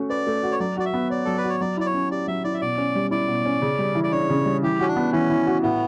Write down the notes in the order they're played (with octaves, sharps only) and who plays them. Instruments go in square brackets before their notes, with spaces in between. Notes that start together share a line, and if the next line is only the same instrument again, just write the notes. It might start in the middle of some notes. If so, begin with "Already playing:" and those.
Already playing: [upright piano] A3 C#4 F#4
[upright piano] B4 [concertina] D5
[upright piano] A3
F#4
[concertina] C#5
[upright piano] F#3 [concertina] D5
[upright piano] F#4 [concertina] D5
[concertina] E5
[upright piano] B3
[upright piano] C#5 [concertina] D5
[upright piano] F#3 [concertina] A4
[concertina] B4
[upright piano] F#4
[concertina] C#5
[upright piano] F#3 [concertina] D5
[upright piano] E4 [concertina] D5
[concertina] C#5
[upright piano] C#4
[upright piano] G4 [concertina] D5
[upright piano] F#3 [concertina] E5
[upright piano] E4 [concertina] D5
[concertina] E5
[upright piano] B2 [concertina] D5
[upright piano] C#4
G3
[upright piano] E4 [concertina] D5
[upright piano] B2
C#4
C#3
G3
E3
[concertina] D5
[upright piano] D4 [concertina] C#5
[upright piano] C#3
G3
[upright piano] E3 [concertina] G4
[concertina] C#4 [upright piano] F#4
[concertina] D4
[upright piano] B3
[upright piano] E3 [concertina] C#4
[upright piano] E3
F#4
[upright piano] A2 [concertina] B3